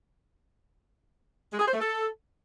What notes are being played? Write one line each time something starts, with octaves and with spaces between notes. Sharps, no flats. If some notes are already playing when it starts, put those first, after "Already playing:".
G#3
G#4
C5
A3
A4